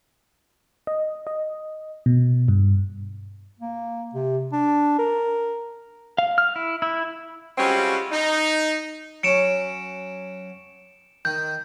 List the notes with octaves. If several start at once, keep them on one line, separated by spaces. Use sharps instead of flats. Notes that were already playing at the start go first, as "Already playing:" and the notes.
D#5
D#5
B2
G2
A#3
C3
D4
A#4
F5
F6
E4
E4
G3 G#3 C4 C#4 F4 F#4
D#4
F#3 C#4 C#7 D7 E7
D#3 G6